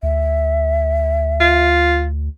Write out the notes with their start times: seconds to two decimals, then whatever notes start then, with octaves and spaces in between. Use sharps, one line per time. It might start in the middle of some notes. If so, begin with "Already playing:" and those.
0.03 D2 E5
1.40 F4